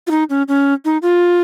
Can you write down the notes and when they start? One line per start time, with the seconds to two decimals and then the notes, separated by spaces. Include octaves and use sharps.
0.07 F4
0.11 D#4
0.30 C#4
0.48 C#4
0.85 D#4
1.02 F4